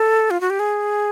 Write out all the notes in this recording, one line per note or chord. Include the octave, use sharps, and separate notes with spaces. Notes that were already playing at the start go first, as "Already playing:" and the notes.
Already playing: A4
F4
F#4
G4
G#4